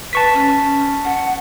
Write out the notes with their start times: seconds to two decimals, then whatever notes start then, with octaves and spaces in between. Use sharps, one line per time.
0.13 B4 A5 C#6 B6
0.34 C#4
1.04 F#5